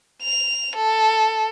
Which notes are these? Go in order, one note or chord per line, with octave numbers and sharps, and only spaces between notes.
F7
A4